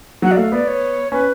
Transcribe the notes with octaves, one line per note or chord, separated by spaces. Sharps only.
F#3 F#5
D5
A3 F5
B3 D5
C#5
C#4 B4